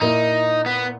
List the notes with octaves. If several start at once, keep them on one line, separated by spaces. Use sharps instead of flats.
A#2 A#3 D#4 E4
B3